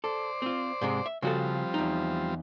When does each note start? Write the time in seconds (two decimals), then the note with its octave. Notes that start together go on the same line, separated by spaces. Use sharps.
0.04 A4 C5 D5
0.42 C4 F4
0.81 G#2 C3 G#3
1.06 E5
1.22 C#3 F3 G3 C4 F#4 A4
1.74 E2 D#4